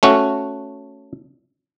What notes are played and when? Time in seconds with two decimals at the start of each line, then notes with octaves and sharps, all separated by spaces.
0.03 A3 C#4 F#4